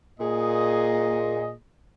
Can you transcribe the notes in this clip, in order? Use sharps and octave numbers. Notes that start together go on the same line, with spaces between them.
A#2 G#4 D#5